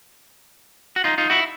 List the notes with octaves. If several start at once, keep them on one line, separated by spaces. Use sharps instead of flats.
F#4
D#4 F4
D#4 F4
E4 F#4